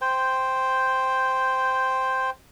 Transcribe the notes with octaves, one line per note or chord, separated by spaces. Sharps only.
C5 G5